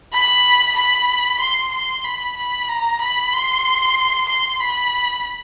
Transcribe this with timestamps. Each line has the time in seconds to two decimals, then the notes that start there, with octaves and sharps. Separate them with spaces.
0.13 B5
0.77 B5
1.40 C6
1.72 C6
2.04 B5
2.37 B5
2.69 A#5
3.01 B5
3.33 C6
4.29 C6
4.60 B5